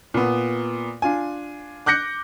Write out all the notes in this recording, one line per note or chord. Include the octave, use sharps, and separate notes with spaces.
A#2 B3
D4 F4 G#5
D6 F#6 G6 A#6 C#7